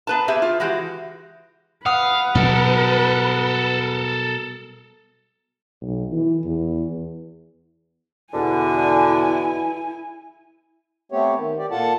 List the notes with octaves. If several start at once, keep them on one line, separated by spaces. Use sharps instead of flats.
B3 B4 A5
C4 G4 G#4 E5
F4
E3 G#3 F#4 G4
B4 F5 F#5 D#6
B2 F#3 G3 A4 A#4
B1
E3
E2
E2 B2 D3 E4 G#5
A3 B3 C4 G4 C#5
D#3
G4 D5
A#2 F4 A4 F#5 A5